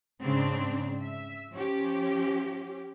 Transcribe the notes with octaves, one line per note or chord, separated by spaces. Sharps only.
G#2 C#3 C4 D4
E5
F3 C#4 G4